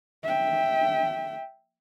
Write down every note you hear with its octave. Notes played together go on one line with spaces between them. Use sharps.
E5 G5